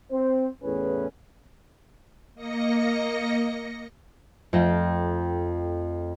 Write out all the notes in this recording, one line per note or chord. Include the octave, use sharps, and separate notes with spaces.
C4 C5
E2 A2 C#4 G#4 B4
A#3 D#5 A#6 C#7
F2 A3 F4 G5 A#6